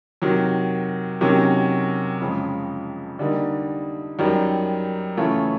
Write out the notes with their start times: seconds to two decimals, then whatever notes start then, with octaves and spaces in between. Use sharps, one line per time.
0.22 C3 D#3 F#3
1.21 C3 D#3 F#3 A#3 C#4
2.20 F2 C#3 F3 G#3
3.19 D3 G3 A#3 D#4
4.19 F#2 D#3 G3
5.17 C#3 E3 A3 C#4 F4